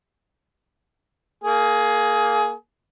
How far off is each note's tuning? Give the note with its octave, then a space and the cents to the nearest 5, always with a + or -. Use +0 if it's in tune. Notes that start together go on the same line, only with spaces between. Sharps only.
A#3 +0 G#4 +20